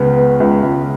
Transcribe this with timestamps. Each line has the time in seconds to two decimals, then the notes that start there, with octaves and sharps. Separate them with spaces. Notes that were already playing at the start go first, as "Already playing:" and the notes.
Already playing: C#2 C#3 B3
0.16 B3
0.40 C#2
0.63 C#2